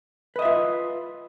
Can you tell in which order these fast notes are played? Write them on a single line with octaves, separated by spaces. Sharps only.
B4 D#5 E5 F4